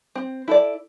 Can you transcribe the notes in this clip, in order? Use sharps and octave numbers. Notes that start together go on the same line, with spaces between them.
C4
E4 A4 D5